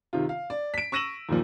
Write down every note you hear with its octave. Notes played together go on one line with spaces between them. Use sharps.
C3 D#3 F4
F5
D5
B6 D7
C#6 E6 A#6 D#7 E7 F#7
D#2 A#2 F3